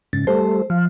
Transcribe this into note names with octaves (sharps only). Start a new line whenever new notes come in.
G#2 C#3 A6
G3 A3 A4 C5
F3 F5